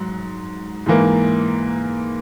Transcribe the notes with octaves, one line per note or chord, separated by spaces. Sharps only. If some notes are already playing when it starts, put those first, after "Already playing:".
Already playing: G#2 F#3
G#2 E3 A#3